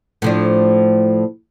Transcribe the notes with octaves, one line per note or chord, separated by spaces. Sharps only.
A2 F3 D4